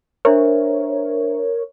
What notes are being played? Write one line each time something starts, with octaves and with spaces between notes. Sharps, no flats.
D4 A#4 C5 C#5 E5